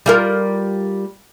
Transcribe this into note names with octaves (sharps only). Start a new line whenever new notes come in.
G3 F4 A#4